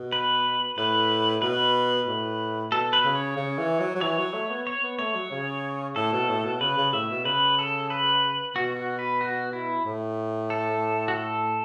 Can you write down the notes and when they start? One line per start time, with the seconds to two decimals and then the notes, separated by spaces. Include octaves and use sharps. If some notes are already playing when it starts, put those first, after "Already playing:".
Already playing: B2
0.12 B4
0.77 A2 B4
1.42 B2 B4
2.07 A2
2.72 B2 A4
2.93 B4
3.04 C#3
3.15 C#5
3.37 C#3
3.58 E3
3.80 F#3
3.95 F#3
4.01 E3 C#5
4.18 F#3
4.34 A3
4.51 B3
4.67 C#5
4.83 B3
4.99 A3 C#5
5.15 F#3
5.31 C#3
5.96 A2 A4
6.12 B2
6.28 A2
6.45 B2
6.61 C#3 B4
6.77 C#3
6.93 A2 E5
7.10 B2
7.25 C#3 B4
7.59 A4
7.90 B4
8.56 B2 F#4
8.77 F#4
8.99 B4
9.21 F#4
9.53 E4
9.85 A2
10.50 A4
11.08 F#4
11.14 A4